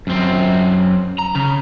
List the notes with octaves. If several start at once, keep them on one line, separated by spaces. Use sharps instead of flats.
F#2 C4
A#5
C#3